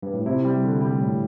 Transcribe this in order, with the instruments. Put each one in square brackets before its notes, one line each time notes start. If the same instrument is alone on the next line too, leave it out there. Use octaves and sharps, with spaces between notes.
[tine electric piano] G2
A2
[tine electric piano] C3 [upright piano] E4
[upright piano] G3
D3
G3
[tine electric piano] A2 [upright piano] D3